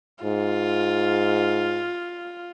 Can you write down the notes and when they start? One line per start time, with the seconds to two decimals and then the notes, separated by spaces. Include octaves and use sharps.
0.24 G#2 F4